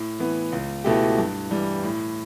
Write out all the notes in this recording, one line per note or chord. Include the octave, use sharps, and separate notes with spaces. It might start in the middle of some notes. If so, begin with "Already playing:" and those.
Already playing: A2
E3 B3
C#2
B2 A3 E4 G4
G2
E3 G3
A2